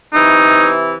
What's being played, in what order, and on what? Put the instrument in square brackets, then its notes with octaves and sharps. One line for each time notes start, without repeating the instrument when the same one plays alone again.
[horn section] C3 E3 [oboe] D#4